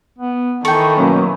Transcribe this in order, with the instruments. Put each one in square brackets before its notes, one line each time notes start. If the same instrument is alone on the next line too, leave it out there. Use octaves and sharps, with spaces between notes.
[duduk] B3
[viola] D#3 E3 [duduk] A4 [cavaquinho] G5 C#6
[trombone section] B2 A#3 C#4 [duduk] F#3